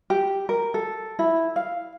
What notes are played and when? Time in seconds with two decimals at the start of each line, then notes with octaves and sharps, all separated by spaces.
0.10 G4
0.49 A#4
0.74 A4
1.19 E4
1.56 F5